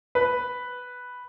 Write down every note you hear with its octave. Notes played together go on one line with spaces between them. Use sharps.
B4